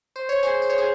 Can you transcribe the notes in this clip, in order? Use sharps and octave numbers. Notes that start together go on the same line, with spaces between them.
C5
C#5
G#4 C5
C5
C#5
G#4 C5